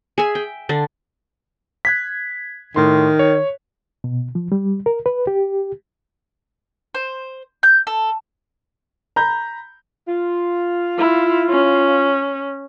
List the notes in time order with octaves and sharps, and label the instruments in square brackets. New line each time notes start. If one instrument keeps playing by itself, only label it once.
[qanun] G#4 E5 G#5
G5
D3 D4
[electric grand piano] F#6 G#6 B6
[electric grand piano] A2 C6 [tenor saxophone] D#3
[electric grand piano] C#5
[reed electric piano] B2
F3
G3
A#4
B4
G4
[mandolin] C5
G6
A4
[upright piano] A#5 B5 G6
[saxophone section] F4
[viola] E4
C#4